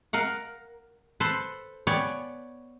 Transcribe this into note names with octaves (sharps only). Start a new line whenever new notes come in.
A#4 F5 F#5
A4 B4 C5
B3 B4 C#5 D5 G5 G#5